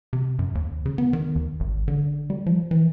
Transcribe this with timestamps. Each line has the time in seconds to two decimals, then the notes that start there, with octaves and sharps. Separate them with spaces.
0.13 C3
0.39 F#2
0.55 D#2
0.86 C#3
0.98 B3
1.13 D#3
1.36 D#2
1.60 G#1
1.88 D3
2.30 G3
2.46 F3
2.71 E3